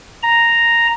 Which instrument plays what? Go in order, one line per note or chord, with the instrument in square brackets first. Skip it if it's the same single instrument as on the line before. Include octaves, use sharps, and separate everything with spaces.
[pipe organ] A#5